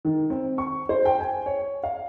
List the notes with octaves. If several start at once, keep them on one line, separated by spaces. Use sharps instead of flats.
D#3
C4
C#6
C5
G5
G#5
C#5
F5